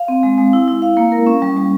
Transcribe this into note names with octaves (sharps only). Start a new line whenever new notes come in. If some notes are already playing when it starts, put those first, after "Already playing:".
Already playing: F5
C4
G#3
G#3
E4
E4
F5
A#3
A#4
C#4
G3
G3